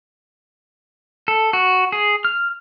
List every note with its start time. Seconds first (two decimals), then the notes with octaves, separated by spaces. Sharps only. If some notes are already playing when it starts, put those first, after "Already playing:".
1.28 A4
1.53 F#4
1.92 G#4
2.25 F6